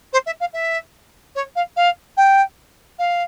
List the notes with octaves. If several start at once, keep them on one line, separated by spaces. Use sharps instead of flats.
C5
E5
F5
E5
C#5
F5
F5
G5
F5